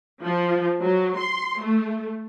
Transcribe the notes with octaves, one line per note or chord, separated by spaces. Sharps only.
F3
F#3
C6
A3